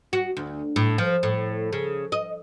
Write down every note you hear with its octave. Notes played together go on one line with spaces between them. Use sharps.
F#4
D2
A2
F3
A2
C#3
D#5